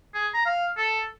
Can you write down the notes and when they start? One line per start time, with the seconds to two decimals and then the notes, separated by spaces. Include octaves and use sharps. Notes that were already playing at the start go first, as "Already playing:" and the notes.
0.14 G#4
0.34 A#5
0.46 F5
0.77 A4